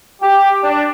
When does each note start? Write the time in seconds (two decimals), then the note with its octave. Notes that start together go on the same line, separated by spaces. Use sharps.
0.21 G4
0.64 D4